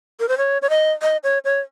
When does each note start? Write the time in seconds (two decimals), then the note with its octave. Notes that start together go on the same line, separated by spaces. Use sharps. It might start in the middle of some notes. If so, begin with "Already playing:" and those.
0.20 A#4
0.28 C5
0.38 C#5
0.62 C#5
0.70 D#5
1.02 D#5
1.24 C#5
1.45 C#5